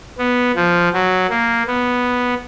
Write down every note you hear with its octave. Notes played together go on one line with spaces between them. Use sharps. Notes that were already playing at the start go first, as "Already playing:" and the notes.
B3
F3
F#3
A#3
B3